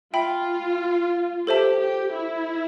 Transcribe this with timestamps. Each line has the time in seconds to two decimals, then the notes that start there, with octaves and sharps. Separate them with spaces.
0.14 F4 E5 G5 B5
1.47 G4 A4 C5 E5 A5
1.80 G4
2.13 E4